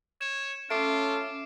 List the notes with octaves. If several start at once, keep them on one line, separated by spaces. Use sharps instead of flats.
C#5 E7
A3 C#4 F4 D6 C7 D7